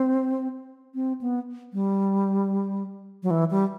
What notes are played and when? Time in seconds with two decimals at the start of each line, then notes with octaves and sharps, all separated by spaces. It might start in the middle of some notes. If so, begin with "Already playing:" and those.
Already playing: C4
0.95 C4
1.21 B3
1.73 G3
3.23 F#3
3.31 E3
3.50 G3